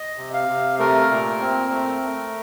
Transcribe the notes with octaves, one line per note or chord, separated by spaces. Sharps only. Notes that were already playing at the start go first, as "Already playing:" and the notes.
Already playing: D#5
C3
F5
C3
A3 A#4
A#2
C4
A3
A3